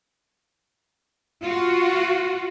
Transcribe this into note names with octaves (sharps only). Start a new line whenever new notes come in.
F4 F#4